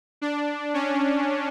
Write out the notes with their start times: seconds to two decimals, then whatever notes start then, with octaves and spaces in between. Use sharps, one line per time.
0.22 D4
0.74 C#4